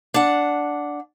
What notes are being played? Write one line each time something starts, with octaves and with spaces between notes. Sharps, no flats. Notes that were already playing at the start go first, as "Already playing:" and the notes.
D4 F#5